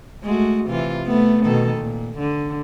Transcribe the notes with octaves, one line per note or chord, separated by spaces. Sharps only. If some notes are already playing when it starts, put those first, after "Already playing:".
G#3 A3 F#4
C3 E3 F4
A3 B3
B2 D#3 A4
A#2
D3